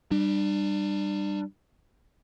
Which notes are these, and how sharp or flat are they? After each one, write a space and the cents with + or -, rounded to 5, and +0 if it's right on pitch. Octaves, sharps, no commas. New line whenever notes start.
G3 +0 D4 +35